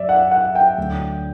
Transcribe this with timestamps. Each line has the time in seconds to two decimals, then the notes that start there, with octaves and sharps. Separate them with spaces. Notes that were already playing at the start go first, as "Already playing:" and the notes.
Already playing: F#2 D5 E5
0.09 F#5
0.31 F#5
0.55 G5
0.78 D2 D3 F#3